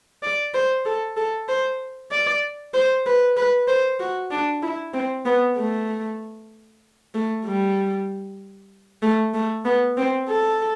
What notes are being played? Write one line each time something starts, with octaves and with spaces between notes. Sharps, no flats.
D5
C5
A4
A4
C5
D5
C5
B4
B4
C5
F#4
D4
E4
C4
B3
A3
A3
G3
A3
A3
B3
C4
A4